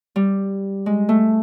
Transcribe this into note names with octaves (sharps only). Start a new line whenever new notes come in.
G3
G#3
A3